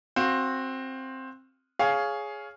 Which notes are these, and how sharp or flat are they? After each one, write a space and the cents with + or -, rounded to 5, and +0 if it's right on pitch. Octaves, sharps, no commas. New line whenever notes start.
C4 +10 F#4 -10 F5 +0
G#4 +5 C#5 +10 F5 +0